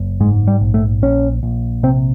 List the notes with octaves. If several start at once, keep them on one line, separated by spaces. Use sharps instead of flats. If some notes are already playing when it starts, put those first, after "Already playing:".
Already playing: F#1
G#2 G#3
G3
A#1
A3
A#1 C#4
A#1
C3 C4